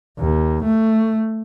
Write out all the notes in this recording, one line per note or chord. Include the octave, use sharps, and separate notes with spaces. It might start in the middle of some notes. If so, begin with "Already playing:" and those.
D#2
A3